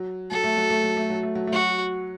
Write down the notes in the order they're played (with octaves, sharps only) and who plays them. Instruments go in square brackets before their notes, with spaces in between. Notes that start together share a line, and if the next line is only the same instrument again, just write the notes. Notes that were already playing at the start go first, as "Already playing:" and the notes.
Already playing: [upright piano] F#3
[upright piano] F#3 [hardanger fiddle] A4
[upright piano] A3
F#3
A3
F#3
A3
F#3
A3
F#3
A3
[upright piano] F#3 [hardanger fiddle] F#4